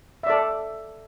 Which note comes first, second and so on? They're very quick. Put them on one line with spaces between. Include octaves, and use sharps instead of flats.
E5 D5 A4